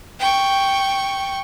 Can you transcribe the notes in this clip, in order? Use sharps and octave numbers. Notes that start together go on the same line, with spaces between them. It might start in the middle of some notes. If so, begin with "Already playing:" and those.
G5 C#6